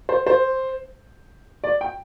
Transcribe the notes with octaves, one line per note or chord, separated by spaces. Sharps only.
C5
C5
D5
G5